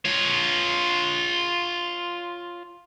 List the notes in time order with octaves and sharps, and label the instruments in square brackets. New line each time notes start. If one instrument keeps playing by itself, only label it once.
[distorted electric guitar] F4 C#5